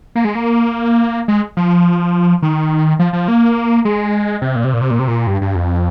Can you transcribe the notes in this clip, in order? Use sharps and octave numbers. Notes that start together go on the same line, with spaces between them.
A#3
G#3
A#3
G#3
F3
D#3
F3
F3
A#3
G#3
C3
A#2
C3
A#2
C3
A#2
C3
A#2
G2
G2
F2